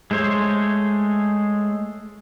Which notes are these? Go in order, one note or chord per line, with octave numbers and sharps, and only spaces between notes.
G#3 A3 C5 C#5